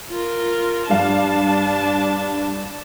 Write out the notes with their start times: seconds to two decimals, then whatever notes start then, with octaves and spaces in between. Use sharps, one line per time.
0.11 F4 A#4
0.90 G2 D4 F5 A5